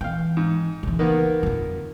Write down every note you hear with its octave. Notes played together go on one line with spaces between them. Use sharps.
E3 F5 G5
G#2
C#3 E3
D#3 A#3 B3
F2 D3